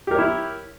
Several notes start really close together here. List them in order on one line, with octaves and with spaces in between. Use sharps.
G4 A#4 C#5 E4